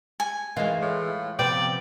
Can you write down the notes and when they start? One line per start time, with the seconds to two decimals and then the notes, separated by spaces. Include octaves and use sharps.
0.20 G#5
0.57 D#3 E3 G#3 F4
0.82 A2
1.39 C3 F3 B3 D5 G5